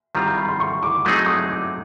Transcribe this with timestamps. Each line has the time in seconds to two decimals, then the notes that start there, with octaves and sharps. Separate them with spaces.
0.15 D#3 G3 C4 F4 A#5
0.26 A#5
0.37 B5
0.48 C6
0.60 C#6
0.83 D6
1.05 F#3 A3 C4 D#4 G#4 D#6
1.26 D#6
1.51 D6